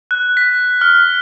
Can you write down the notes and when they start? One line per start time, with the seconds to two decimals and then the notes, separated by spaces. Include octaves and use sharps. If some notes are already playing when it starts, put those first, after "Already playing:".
0.11 F#6
0.37 B6
0.81 F6